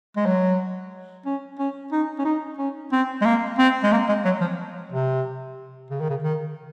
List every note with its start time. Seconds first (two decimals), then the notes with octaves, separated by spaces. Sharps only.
0.17 G#3
0.26 F#3
1.26 C#4
1.59 C#4
1.92 D#4
2.19 C#4
2.25 D#4
2.58 C#4
2.92 C4
3.21 G#3
3.25 A#3
3.58 C4
3.83 G#3
3.92 A#3
4.08 G#3
4.25 F#3
4.41 F3
4.92 C3
5.90 C#3
6.01 D#3
6.09 C#3
6.24 D#3